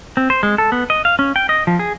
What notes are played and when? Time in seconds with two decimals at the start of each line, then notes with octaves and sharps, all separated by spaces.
0.17 C4
0.30 C5
0.43 G#3
0.58 A4
0.72 B3
0.90 D#5
1.05 F5
1.19 C#4
1.36 G5
1.49 D#5
1.67 F3
1.79 G#4